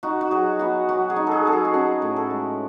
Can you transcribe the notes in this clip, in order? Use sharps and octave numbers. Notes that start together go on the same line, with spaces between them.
D#4 F#4
F#4
F#3 G#4
B3 F#4
F#3 F#4
G#4
D#4
G#4 A4
F#3 A4
G#4
F#4
C#4 G#4
A2
A4
G#3